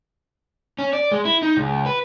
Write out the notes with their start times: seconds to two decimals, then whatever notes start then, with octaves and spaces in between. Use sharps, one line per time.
0.79 C#4
0.93 D5
1.11 G#3
1.25 E4
1.43 D#4
1.57 C#2
1.86 B4